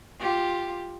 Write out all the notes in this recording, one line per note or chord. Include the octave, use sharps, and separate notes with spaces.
F4 G4